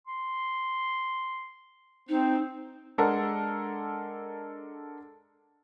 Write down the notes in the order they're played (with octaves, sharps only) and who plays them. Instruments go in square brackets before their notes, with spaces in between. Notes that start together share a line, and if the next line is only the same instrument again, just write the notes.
[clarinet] C6
[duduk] C4 [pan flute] D#4 [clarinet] C5
[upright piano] G#3 D4 A4 A#4 F#5